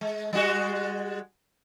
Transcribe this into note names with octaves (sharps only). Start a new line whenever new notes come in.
G#3
G3 G#3 F#4